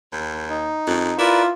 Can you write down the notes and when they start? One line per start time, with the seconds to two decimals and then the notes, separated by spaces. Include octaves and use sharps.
0.12 D#2
0.50 D#4
0.87 F2
1.18 E4 F4 A#4 B4 D5